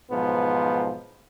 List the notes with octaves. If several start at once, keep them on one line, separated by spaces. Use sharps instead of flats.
B1 G#2 F3 B3